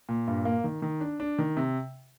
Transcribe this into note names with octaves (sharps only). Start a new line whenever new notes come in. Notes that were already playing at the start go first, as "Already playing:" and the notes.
A#2
G2
A#3
D#3
D#3
D4
D4
D#3
C3